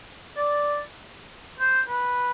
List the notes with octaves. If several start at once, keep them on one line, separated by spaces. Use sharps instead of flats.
D5
C5
B4